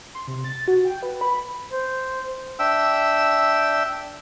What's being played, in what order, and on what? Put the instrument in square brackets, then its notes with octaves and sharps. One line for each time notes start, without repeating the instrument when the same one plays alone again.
[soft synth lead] C6
C3
A6
F#4
G5
B4
B5
[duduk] C5
[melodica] D4 E5 G5 E6